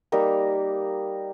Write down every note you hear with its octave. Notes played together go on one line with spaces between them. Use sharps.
G3 A#3 D#4 A#4